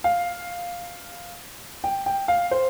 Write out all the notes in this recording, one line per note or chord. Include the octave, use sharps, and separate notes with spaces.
F5
G5
G5
F5
C5